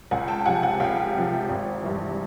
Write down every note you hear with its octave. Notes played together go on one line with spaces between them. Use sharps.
C#2 F#5 G#5
G5 A5
C3 F3 F#5 G#5
F#5 G#5
C#2 F5 G5
C3 F3
G#1
G2 E3